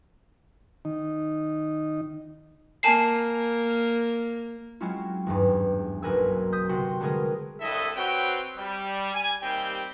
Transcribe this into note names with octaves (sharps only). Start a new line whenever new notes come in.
D#3 D#4
A#3 G#5 A5 C7
F#3 G#3 C4 C#4 E4 F4
G#1 E2 G2
F#1 B1 A#4 B4 G#5 E6
D#6 G6 B6
G1 C3 C4 F#4 C6
D3 G3 G#3 B3 G#4 A#4
C2 G2 E4 A4 D#5 E5
C4 F#4 B4 C#5 G5
G3
G#5
D#2 G3 C4 G4 G5